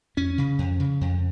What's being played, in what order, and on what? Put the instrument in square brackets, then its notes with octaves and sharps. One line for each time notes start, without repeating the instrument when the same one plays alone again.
[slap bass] F2 C#4
C#3
F2
C#3
F2